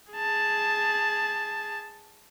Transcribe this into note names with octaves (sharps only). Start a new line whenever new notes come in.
G#4 A5